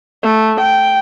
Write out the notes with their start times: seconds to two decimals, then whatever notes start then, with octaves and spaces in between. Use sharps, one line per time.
0.23 A3
0.60 G5